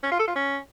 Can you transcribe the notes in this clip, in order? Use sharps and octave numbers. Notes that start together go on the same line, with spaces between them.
C#4
F4
A4
F4
C#4